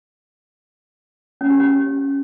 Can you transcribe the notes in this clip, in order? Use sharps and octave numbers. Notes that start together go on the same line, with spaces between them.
C#4
G4
C#4